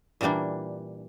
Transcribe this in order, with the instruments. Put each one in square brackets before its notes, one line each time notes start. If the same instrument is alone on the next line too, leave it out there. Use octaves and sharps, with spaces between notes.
[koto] A#2 E3 G3 A#3 D4